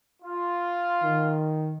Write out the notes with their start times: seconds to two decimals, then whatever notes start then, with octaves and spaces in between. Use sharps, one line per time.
0.22 F4
1.03 D#3